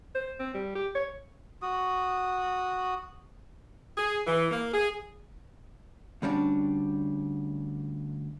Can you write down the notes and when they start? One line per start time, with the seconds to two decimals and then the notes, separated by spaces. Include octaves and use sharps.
0.15 C5
0.40 C4
0.54 G3
0.75 G4
0.95 C#5
1.62 F#4 D#6
3.98 G#4
4.27 E3
4.52 A#3
4.74 G#4
6.22 D2 G3 C#4 D4